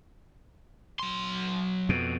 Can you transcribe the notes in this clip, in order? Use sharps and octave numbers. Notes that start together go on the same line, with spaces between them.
F#3 C6
F2 B2